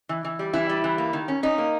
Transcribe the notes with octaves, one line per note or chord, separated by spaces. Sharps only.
E3
E3
G3
E3 E4
G3
E3
A#3
D#3
C#4
C#4 D#4
A#3